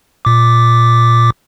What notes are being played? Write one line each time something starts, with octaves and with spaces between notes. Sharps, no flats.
A#2 D6